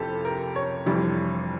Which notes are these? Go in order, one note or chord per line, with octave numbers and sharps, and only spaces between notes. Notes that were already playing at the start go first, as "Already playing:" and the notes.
Already playing: F1 F2 E3 G4 A4
A#4
C#5
F1 F2 E3 G3 D4